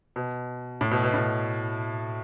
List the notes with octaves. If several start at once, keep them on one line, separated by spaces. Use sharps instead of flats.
B2
A2
B2
B2
A2